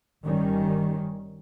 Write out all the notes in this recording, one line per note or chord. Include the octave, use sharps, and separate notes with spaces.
G1 D#3 G3 C#4